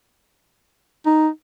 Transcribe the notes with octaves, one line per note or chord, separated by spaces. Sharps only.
D#4